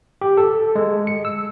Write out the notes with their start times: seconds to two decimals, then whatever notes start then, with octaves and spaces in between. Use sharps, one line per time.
0.21 G4
0.37 A4
0.75 G#3
1.07 C#7
1.25 E6